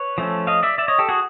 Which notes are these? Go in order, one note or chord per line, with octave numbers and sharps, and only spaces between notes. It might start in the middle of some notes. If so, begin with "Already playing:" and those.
Already playing: B4 C#5
F3 A3 C#4
D#5 F5
D5 E5
D5 E5
C#5 D#5
G4 A4
F#4 G#4